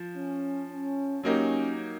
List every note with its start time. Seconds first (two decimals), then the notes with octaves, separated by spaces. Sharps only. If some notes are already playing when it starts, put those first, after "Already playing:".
Already playing: F3
0.15 C#4
0.69 C#4
1.23 F#3 A#3 C#4 D#4 G4